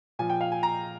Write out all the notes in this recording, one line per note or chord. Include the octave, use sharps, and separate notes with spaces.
A#2 F3 G#5
G5
F5
G#5
A#5